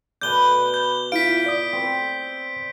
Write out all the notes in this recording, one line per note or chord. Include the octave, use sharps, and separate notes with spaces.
B2 B4 D5 G6 G7
G6
E4 F4 F5 B6 D7
D5 D#6
C4